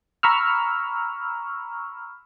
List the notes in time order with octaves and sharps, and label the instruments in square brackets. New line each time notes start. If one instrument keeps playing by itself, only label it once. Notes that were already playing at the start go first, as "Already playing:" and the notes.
[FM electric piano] A#5 B5 C#6 E6 F6